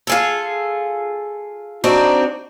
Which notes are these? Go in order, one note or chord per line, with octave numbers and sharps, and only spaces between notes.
F4 G#4 A4
C4 D4 D#4 F#4